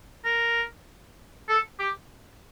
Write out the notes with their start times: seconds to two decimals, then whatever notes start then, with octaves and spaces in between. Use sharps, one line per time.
0.25 A#4
1.49 A4
1.80 G4